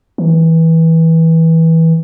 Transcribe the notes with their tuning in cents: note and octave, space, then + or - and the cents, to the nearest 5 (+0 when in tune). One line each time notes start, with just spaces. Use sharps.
E3 -20